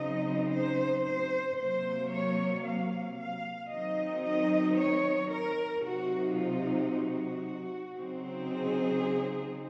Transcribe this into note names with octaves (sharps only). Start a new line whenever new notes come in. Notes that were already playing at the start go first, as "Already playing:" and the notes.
Already playing: C#3 F#3 C4 D#4 D#5
C5
C5
C3 F#3 A#3 C5
C#5
F5
F5
D#3 F#3 C4 D#4 D#5
D#5
C#5
A#4
C3 F#3 C4 D#4 F#4
F4
F#4
C#3 F#3 C4 D#4
G#4